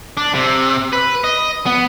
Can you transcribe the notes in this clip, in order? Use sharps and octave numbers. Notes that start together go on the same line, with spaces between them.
D4
C3
B4
D#5
B3